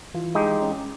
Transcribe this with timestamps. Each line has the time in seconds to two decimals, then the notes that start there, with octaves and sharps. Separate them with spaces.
0.14 E3 F4
0.35 G#3 D#4 G4
0.62 C#4